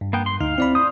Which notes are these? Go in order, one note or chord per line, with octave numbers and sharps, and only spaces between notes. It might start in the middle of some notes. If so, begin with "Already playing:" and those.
G2
A#3 B3 G5
C6
D2 D#4 F5
C4 E4 D5 B5
C5 D#6